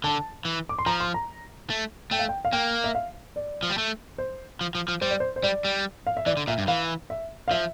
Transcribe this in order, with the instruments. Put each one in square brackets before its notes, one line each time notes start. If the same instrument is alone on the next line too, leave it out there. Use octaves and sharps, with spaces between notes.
[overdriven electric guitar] D3 [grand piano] A5
[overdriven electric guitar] E3
[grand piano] D6
C6
[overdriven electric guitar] F3 [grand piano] A#5
[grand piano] C6
A#5
[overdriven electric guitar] A3
[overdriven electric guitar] A3 [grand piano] G5
[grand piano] F5
G5
F5
[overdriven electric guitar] A#3 [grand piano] G5
[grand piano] E5
F5
D5
[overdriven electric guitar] F3
G3
A3
[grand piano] C5
[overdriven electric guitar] F3
F3
F3
[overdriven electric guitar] G3 [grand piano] C5
[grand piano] D5
C5
C5
[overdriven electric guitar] G3 [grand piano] D5
[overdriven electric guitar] G3
[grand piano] F5
E5
[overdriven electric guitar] E3 [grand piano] D5
[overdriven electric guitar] D3
[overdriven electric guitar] A#2 [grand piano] E5
[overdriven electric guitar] G2
[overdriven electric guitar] E3 [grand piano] F5
[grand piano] E5
F5
[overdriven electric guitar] F3 [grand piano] E5